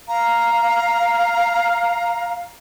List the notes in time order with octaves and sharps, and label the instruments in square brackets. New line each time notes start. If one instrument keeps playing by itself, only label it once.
[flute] F5 [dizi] A#5